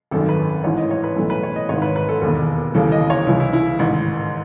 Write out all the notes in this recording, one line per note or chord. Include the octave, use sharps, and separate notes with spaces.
G#1 F#2 D#3 A4
B4
A1 G#2 E3 C#5
D#5
C#5
B4
B1 A2 E3 A4
B4
C#5
D#5
G#1 G#2 D#3 C#5
B4
B4
A4
E1 D#2 D#3 A4
D#2 C#3 E3 A4
D#5
C#5
C#2 C#3 E3 E4
E4
E4
A1 G#2 D#3